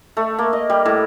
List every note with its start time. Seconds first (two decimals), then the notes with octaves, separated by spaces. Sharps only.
0.17 A3
0.39 A#3
0.53 D#5
0.70 G3
0.86 A2